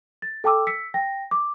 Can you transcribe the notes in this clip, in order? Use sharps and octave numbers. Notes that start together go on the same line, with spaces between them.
A6
A4 G5 A5 D6 E6
E6 B6 C#7
G5 A#6
D6